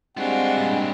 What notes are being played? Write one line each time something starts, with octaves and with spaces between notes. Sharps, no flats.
G3 G#3 C4 D4 F4 F#4 F#5
G2 A#2